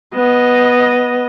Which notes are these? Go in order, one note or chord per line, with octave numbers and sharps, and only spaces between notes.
B3 D#5